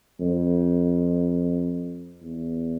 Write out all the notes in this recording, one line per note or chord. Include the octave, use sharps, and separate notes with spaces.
F2
E2